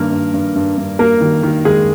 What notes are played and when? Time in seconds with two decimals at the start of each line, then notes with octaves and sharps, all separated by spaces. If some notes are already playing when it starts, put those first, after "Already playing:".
Already playing: G2 D#3 A#3 A#4
0.12 G2
0.34 G2
0.55 G2
0.78 G2
0.99 A#3 A#4
1.21 D#3
1.43 D#3
1.65 D#3 G#3 G#4